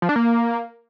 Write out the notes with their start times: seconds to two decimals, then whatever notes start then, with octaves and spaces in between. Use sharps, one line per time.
0.02 F3
0.09 D4
0.16 A#3